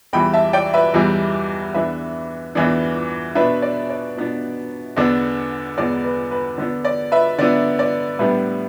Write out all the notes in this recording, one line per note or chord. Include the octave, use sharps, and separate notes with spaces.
E2 E3 G3 G5 B5
E5 A5
D5 G5
B4 E5
E2 E3 G3
E2 E3 B3 D4 B4 E5
E2 E3 B3 D4
B2 B3 D4 B4 E5
D5
D5
B2 B3 D4
E2 D3 B3 D4
E2 D3 B3 D4 D5
B4
B4
D3 B3 D4
D5
B4 E5
D3 B3 D4 D5
D5
A2 G3 B3 D4 B4 E5